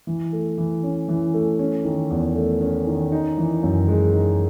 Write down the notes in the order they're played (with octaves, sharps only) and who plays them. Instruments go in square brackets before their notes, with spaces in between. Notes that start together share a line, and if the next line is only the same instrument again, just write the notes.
[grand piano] E3
A3
E3
C#4
E3
A3
C#4
D#3
E2
A3
C#4
D#3
D#4
E3
F#2
G#3
D#4